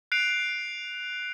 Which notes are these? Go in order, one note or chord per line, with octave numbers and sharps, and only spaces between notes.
F#6 C7 D7 F7